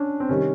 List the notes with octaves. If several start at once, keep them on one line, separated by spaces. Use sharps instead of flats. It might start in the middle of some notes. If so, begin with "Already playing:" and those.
Already playing: C#4 D4
C4
C3 D#3 G3 C#4